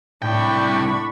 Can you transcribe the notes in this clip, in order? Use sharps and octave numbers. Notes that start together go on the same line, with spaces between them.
C2 A2 D4 G5 B5 C#6